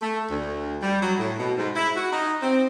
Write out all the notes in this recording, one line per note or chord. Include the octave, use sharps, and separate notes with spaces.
A3
D2
G3
F#3
A2
B2
G#2
E4
F#4
D#4
C4